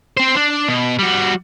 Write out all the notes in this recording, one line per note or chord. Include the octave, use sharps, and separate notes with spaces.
C4 C5
D4
B2
G3 F#4